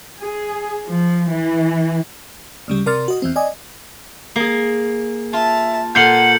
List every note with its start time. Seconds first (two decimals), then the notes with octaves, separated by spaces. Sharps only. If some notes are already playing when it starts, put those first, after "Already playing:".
0.20 G#4
0.86 F3
1.32 E3
2.68 D2 C#3 G3
2.86 C3 A#4 D5 C6 F6 A6
3.08 F#4 D#5
3.22 E2 E3 C4
3.36 D5 D#5 G#5
4.36 A#3 G#4
5.33 F4 E5 A5
5.95 A#2 A4 F5 F#5 C6 G6 C#7 F#7